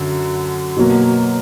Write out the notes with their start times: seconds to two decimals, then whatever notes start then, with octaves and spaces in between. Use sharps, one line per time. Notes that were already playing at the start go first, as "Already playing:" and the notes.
Already playing: F#2 D3
0.77 B2 F#3 A#3